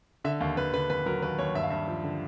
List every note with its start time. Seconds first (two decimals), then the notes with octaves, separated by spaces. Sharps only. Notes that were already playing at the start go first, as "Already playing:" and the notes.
0.24 D3 E5
0.40 D#2 F5
0.57 D#2 B4
0.73 D3 B4
0.90 D#2 B4
1.06 F#3 A#4
1.22 D#2 B4
1.39 D#2 C#5
1.55 G2 E5
1.63 F5
1.70 G2 E5
1.87 F3
2.04 D3